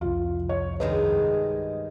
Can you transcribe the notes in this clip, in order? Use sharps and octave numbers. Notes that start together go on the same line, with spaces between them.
C2 F2 F4
C#5
G2 D#3 G#3 B4 D#5